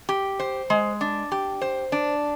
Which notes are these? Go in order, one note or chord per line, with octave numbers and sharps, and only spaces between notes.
G4
C5
G#3
D4
G4
C5
D4